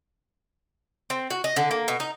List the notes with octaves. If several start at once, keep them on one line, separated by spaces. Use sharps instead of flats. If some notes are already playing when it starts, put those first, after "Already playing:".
C4
F#4
D#5
D3
A#3
B2
D#4